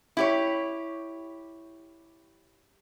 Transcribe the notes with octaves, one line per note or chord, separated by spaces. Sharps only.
E4 G4 C#5